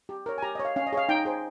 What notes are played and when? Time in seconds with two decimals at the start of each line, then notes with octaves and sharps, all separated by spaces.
0.09 G4
0.26 A#4 C#5
0.38 G#5
0.42 G4 A#5
0.55 C#5 D#5
0.65 F5
0.76 C#4 F5
0.87 D#5
0.93 G#4 C#5 F5
1.09 D#4 G5
1.25 G#4 C5